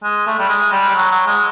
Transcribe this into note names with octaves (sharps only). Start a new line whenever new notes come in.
G#3
A3
G3
G#3
G3
G3
F#3
F#3
G#3